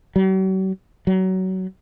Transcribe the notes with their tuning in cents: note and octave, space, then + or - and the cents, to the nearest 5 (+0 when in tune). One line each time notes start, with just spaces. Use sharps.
F#3 +45
F#3 +25